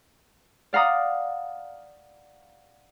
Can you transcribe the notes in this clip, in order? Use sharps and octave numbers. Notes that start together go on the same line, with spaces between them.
D5 F5 F#5 A#5 D#6